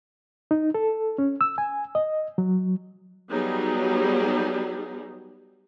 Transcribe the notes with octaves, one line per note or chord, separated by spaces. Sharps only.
D#4
A4
C#4
E6
G#5
D#5
F#3
F#3 G3 B3 D#4 G#4